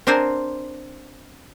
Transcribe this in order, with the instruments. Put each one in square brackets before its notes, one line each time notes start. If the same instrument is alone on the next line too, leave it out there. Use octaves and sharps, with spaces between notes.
[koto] C4 D4 A#4 C5 G#5